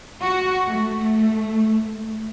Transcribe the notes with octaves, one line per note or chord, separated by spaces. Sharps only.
F#4
A3